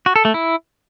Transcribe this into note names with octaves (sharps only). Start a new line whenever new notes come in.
F#4
A4
A3
E4